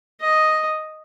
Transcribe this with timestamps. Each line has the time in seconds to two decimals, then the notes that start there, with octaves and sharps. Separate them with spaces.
0.21 D#5